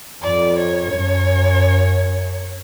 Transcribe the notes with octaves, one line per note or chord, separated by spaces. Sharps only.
F2 D5
C#5
F#2